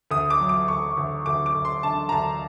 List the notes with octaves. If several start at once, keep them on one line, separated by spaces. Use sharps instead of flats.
D2 D#6
D6
F#3
D6
D2 C#6
D2
D2 D6
D6
D2
C6
D3 A5
A#5
D2 A5